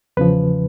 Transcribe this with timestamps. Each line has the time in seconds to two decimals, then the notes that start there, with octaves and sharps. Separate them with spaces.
0.17 E2 C#3 F3 B4